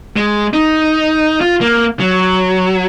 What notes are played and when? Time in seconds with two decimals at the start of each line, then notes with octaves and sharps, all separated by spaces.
0.16 G#3
0.53 D#4
1.41 F4
1.61 A#3
2.00 F#3